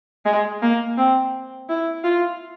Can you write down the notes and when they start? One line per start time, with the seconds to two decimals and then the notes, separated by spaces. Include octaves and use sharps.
0.26 G#3
0.62 A#3
0.97 C4
1.69 E4
2.04 F4